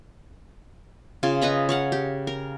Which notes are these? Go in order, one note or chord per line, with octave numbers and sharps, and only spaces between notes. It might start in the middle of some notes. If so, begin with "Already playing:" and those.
C#3 F4
B4 D#5 A#5 B5
C#5 F5 F#5
G4
A#4